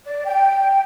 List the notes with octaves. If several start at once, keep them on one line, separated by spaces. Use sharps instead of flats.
D5
G5